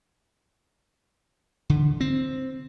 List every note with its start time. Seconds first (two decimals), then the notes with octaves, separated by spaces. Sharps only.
1.70 D3
2.01 C4